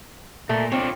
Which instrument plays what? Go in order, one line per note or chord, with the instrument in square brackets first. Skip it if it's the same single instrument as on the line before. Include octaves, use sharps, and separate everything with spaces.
[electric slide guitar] A#2 [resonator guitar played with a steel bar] A3
[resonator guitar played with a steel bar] C4 [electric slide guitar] D4 F4 C#5